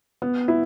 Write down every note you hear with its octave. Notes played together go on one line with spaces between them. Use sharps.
B3
E4